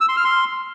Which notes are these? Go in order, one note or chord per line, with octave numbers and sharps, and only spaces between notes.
E6
C6
F6
C6